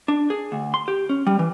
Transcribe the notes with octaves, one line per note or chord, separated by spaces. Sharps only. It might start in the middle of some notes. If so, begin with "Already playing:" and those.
D4
G#4
D2
C6
G4
C#4
G3
E3